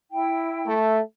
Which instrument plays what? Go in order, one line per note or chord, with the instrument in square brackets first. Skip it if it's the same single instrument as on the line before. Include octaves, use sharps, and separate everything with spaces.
[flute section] E4 G5
[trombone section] A3